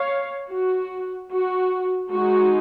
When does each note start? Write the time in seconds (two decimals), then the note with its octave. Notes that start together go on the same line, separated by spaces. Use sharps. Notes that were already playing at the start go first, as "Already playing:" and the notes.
Already playing: C#5 F5
0.50 F#4
1.31 F#4
2.11 G#3 D#4 F#4